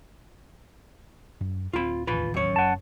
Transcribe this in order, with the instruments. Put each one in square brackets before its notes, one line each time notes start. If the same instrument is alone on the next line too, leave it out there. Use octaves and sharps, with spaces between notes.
[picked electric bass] F#2
[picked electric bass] D1 B3 C4 [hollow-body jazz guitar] F4 B5
[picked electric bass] E1 A1 D#2 [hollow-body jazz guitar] F4 B4 B5
[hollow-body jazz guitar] F#2 C#5
[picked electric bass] F#1 [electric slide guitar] F#5 A5